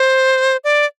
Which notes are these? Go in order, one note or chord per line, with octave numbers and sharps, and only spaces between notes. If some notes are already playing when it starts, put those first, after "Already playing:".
Already playing: C5
D5